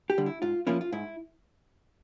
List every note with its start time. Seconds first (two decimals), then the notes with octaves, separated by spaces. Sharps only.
0.10 G4
0.18 D3 G3
0.26 E4
0.42 G#2 F4
0.67 F3 A#3 C#4 E4 F4
0.81 F4
0.92 G#2 E4